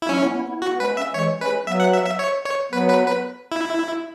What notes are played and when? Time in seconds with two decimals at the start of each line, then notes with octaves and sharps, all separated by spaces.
0.02 E4
0.09 F#3 C#4
0.22 B3 E4
0.36 B3 E4
0.48 B3 E4
0.62 F#4
0.71 B3
0.79 G#3 C#4 B4
0.92 B3
0.97 G#3 C#4 E5
1.14 E3 G#3 C#5
1.40 G#3 C#4 B4
1.67 F#3 B3 E5
1.80 F#5
1.93 E5
2.06 E5
2.19 C#5
2.46 C#5
2.72 F#3 B3 B4
2.89 B4
3.07 B4
3.52 E4